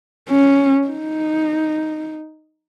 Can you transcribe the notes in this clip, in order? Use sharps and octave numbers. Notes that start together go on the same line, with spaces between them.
C#4
D#4